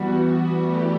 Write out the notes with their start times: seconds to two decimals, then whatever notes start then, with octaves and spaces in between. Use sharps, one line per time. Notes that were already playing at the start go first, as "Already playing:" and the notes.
Already playing: E3 G3 B3 F#4
0.62 E3 A3 E4 G4